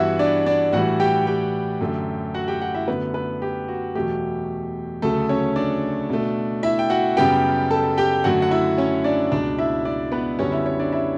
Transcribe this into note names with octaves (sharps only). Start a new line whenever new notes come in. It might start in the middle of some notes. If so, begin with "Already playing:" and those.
Already playing: G2 E3 B3 E4 F#4 E5 F#5
D4 D5
D4 D5
A2 E3 G3 F#4 F#5
G4 G5
G4 G5
F#2 D3 F#3 A3
F#4 F#5
G4 G5
F#4 F#5
E4 E5
F#2 D3 A3 B3 B4
B3 B4
G4
F#4
E2 B2 F#3 A3 G4
D2 C#3 F#3 A3 A4
C#4 C#5
D4 D5
B2 A3
E4 E5
G5
F#4 F#5
F#2 C#3 G3 B3 G4 G5
A4 A5
G4 G5
F#2 D3 F#3 A3 F#4 F#5
F#5
E4 E5
C#4 C#5
D4 D5
C#2 B2 F#3 D4 D5
E4 E5
D4 D5
B3 B4
F#2 D3 G3 B3 C#4 C#5
E4 E5
C#4 C#5
D4 D5
E4 E5